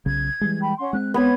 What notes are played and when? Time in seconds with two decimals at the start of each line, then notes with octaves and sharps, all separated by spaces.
0.06 B1 C#3 G#6
0.41 E3 G3 G#3
0.59 G5 B5
0.78 C#4 F#5 C6
0.93 G#3 C4 F#6
1.14 B3 B4 C#5 F#5 G#6